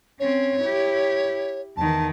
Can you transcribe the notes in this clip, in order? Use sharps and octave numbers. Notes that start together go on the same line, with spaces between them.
C4 C#4 C#5
E4 G4
E2 D#3 A5